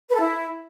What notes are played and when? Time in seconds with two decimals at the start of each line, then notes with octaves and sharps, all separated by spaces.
0.09 B4
0.14 A4
0.20 E4